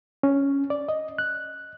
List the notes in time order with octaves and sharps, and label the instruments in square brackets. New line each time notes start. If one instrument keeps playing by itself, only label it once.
[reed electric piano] C#4
D5
D#5
F#6